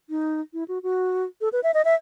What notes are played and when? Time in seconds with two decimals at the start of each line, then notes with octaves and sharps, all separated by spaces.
0.10 D#4
0.53 E4
0.68 F#4
0.83 F#4
1.41 A4
1.53 B4
1.63 E5
1.74 D#5
1.85 E5